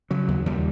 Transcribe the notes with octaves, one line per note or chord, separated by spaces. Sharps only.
C#3 F#3
D#2
D#2 G3